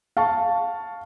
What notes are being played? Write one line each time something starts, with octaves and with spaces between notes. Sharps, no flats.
F5 A5 C#6